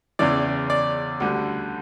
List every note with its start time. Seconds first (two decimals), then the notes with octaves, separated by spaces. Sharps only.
0.19 E2 C#3 E3 D5
0.70 D5
1.20 D2 D3 G3